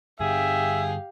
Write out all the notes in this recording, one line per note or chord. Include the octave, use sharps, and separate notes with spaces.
G2 D3 G4 G#4 E5 F5